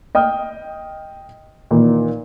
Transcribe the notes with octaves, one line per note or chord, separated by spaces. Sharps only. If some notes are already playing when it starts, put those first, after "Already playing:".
D#5 G5 D#6 F6
A#2 D#3 E3 A#3